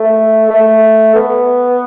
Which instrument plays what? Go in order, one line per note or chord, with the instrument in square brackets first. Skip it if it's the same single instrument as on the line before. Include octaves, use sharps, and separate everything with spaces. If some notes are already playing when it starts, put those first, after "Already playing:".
Already playing: [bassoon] A3
A3
B3